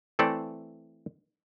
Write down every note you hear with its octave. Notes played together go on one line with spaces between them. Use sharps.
E3 A3 C4 A4 D5